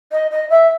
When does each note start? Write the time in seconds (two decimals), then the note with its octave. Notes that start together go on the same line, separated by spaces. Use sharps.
0.12 D#5
0.31 D#5
0.50 E5